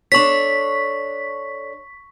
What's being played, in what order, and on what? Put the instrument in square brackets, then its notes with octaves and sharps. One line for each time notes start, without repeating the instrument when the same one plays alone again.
[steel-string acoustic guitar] D4 A4 C#5 [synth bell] C#6 B6